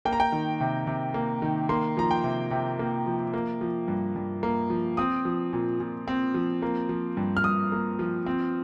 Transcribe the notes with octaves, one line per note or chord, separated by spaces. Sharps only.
A#3 G5
A#5
G5
D#3
C3
C3
A#3
D#3
A#3 C6
F3 A#5
G5
C3
C3
A#3
F3
A#3
F3
G2
G2
A#3
F3
C4 D#6
F3
A#2
A#2
C4
F3
A#3
F3
G2
F6
G2 D#6
A#3
F3
C4